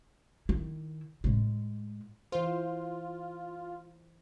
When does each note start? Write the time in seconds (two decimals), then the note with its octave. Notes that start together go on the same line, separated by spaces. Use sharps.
0.49 D#3 E4
1.24 A2 G#3
2.32 E3 F4 C5